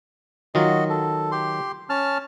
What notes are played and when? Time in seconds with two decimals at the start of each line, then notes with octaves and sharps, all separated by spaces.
0.55 D#3 F#3 F4 F#4 D#5
0.90 A4
1.32 G4 C6
1.89 C#4 A5 F6